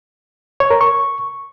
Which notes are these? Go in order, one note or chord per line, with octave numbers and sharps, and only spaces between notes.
C#5
A#4
C#6